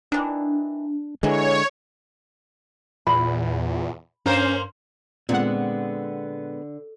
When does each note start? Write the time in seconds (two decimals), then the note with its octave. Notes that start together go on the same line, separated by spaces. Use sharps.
0.12 D#3 E3 D4
1.23 D3 E3 F#3 G#3 C#5
3.07 E2 A#2 B5
4.26 G2 A#3 C#4 A#4 C5
5.29 A#2 D3 G#3 B3 C4 F#5